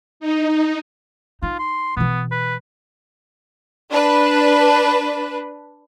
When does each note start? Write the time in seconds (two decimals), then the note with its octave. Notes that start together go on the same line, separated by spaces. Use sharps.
0.20 D#4
1.42 D#4 F4
1.59 C6
1.97 B2 E3 B3
2.31 B4
3.91 D4 B4